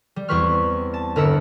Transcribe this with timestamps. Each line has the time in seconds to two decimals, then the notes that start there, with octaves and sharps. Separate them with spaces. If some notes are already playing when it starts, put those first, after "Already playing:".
0.16 G3
0.29 E2 G3 C4 B4 C#6 F6
0.94 A5
1.16 G1 A#4 B4 E6 C#7